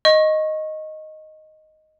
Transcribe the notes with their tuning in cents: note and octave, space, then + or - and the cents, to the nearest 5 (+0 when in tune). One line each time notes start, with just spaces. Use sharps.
D#5 +0 C#6 -25